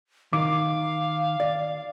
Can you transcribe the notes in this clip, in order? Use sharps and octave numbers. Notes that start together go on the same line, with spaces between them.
D#3 F5 D6
D5